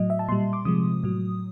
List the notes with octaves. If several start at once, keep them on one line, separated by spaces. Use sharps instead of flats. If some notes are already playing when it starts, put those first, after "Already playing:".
Already playing: A2 F#3 D#5
E5
A5
A#2 G3 C6
D6
C3 F3 G#3 D#6
A2 F#3